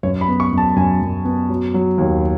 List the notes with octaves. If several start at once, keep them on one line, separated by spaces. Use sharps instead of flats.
F#2 C#5
B5
B3
C#6
F#2
A5
F#2 G#5
F#2
B3
F#3
F#3
D#2